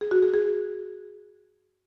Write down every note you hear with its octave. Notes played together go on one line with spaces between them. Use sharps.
G#4
F#4
G#4
G#4